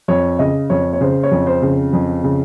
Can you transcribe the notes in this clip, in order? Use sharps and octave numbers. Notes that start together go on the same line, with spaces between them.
F2 C#5
C#3 D#5
F2 C#5
C#5
C#3 C5
C#5
F2
C5
C#3
F2
C#3